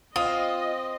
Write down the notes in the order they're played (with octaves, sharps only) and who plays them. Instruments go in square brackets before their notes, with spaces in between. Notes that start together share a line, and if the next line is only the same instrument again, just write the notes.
[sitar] C4 [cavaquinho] F4 [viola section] D#5 [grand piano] D#6